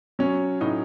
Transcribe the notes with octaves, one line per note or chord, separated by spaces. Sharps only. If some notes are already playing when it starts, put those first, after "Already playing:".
F#3 C#4
A2 D#4